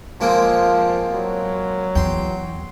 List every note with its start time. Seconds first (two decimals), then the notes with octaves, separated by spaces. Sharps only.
0.21 F3 G#3 A#3 C4
1.14 F#3
1.95 E2 G5 C6